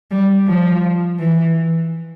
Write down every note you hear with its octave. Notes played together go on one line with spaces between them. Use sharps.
G3
F3
E3